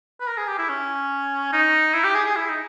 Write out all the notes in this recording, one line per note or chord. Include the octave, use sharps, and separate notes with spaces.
B4
A#4
G#4
G4
E4
C#4
D#4
E4
G4
G#4
G#4
E4
D#4